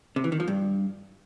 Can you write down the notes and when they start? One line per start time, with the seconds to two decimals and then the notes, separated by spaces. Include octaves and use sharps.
0.16 C3
0.24 E3
0.32 D#3
0.40 F3
0.48 G2